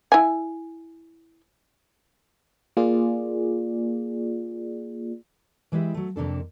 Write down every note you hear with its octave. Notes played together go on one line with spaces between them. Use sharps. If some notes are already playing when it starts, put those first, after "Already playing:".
E4 G#5
A#3 F4 G#4 D5
E3 G#3 E4 G4 E5
F#3 A3
F2 C3 A#3 D4 A4